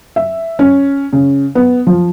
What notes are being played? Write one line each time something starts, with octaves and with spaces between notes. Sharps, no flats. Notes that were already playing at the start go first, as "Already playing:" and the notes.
E5
C#4
C#3
B3
F3